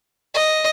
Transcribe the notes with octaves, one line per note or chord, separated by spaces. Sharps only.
D#5